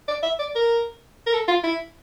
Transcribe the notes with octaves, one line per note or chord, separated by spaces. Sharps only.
D5
E5
D5
A#4
A#4
A4
F4
E4